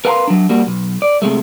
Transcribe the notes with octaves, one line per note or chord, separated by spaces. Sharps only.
A#4 B4 F5 G5 A#5 C6
F#3 D4
G3 A#3 F#4
B1
D5
C3 G#3 A3